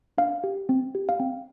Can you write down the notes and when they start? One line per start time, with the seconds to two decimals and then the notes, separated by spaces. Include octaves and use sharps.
0.18 D4 F5
0.44 G4
0.69 C4
0.95 G4
1.09 F5
1.20 C4 G5